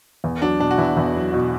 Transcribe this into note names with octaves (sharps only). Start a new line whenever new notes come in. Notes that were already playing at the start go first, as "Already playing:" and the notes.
E2
F#3 D4
B2 D4
F#4
E2 E4
E2
F#3
B2